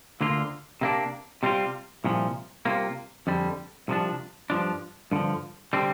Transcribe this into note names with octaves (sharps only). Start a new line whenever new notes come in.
D2 D3 A#3 F4
C3 A#3 D4
C3 G3 C4 F4
C2 A#2 F3
C2 C3 A#3 F4
F2 D3 G3
C2 C3 F3 D4
G2 F3 D4
G2 D3 F3
D3 G3 C4